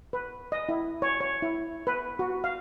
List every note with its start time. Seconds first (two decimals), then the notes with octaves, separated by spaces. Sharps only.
0.13 B4
0.52 D#5
0.69 E4
1.02 C#5
1.21 C#5
1.42 E4
1.87 B4
2.19 F#4
2.44 F5